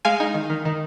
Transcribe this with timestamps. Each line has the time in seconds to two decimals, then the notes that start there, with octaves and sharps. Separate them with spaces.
0.05 G#3 F5 G#5
0.20 D#4
0.34 D#3
0.50 D#3
0.65 D#3